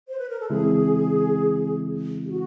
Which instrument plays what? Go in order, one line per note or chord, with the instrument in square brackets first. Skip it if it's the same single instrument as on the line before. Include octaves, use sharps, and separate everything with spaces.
[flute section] C5
B4
A#4
A4
[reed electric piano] C#3 E3 G#3 C4 E4 [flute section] G#4
[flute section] G4
F#4